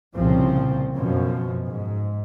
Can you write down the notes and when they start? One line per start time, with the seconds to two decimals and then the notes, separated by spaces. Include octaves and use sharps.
0.16 C2 A#2 C#3 F3 C4
0.96 F#2 B2 F3
1.66 G#2